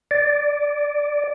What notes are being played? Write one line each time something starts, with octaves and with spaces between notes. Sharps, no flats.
D5